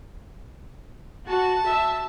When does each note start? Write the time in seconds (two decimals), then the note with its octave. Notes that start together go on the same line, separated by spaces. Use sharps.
1.28 F#4 A5
1.68 E5